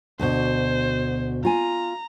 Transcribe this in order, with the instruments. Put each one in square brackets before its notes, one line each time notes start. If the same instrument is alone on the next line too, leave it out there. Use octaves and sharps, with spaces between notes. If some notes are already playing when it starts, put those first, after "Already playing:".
[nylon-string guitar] D2 B2 [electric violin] C5
[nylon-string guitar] F4 G#5 [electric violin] A#5